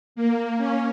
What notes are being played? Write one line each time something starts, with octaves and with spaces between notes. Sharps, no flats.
A#3
C#4